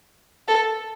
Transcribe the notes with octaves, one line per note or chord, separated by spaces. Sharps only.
A4